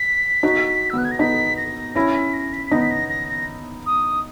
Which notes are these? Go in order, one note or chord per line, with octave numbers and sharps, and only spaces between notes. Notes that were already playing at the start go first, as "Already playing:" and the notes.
Already playing: B6
D#4 F#4
E6
B3 F#6
G#6
A#6
B3 D#4 B6
A#6
C#4 E4 A#6
B6
A#6
B6
B6
B3 D#4 A#6
B6
A#6
A#6
A#6
D#6